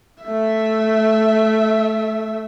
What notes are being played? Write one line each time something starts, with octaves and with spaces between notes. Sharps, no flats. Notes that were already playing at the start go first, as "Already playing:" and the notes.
A3 E5